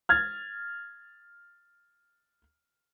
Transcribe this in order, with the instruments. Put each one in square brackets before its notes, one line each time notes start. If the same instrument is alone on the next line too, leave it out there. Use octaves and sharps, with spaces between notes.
[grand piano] F6 G#6 A6